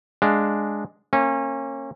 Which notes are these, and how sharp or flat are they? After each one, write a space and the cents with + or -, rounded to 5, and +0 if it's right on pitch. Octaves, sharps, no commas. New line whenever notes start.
G#3 +0 D4 +0 F5 +0
A#3 -30 C#4 -30